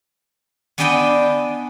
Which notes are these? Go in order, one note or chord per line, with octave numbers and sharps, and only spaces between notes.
B3 D4 G#4 B4 D#5 G5